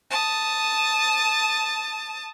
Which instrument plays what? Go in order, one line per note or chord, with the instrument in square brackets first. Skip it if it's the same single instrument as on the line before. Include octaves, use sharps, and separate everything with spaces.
[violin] A5 D#6